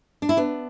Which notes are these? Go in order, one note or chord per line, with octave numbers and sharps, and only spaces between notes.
D4
E4
B3 D4